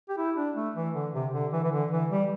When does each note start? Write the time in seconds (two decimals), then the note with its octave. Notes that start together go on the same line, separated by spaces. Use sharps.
0.09 G4
0.18 E4
0.36 D4
0.56 A3
0.76 E3
0.94 D3
1.14 C3
1.33 D3
1.53 E3
1.64 E3
1.72 D3
1.91 E3
2.10 G3